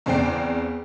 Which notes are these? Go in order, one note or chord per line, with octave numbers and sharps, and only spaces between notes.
E2 C#3 C4 D5 G5 C7